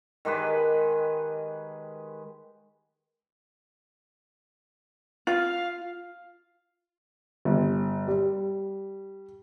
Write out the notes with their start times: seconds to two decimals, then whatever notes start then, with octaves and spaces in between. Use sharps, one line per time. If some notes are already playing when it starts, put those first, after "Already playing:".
0.25 D#3 G#3 G4 B4
5.27 F4 F5
7.45 G1
8.08 G3